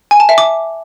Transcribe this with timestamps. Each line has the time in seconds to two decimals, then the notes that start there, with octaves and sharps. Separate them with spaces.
0.11 G#5
0.20 A5
0.29 E5
0.38 D6